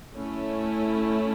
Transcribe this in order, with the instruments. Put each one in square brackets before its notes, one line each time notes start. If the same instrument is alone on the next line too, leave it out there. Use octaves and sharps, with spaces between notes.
[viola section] A3 C#4 E4